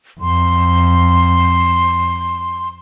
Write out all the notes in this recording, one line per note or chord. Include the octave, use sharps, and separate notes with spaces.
F2 C6